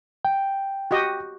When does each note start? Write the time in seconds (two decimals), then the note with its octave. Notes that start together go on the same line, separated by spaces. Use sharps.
0.25 G5
0.91 F#4 G4 D#5